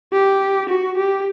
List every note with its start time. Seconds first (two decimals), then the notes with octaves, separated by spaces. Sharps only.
0.13 G4
0.69 F#4
0.97 G4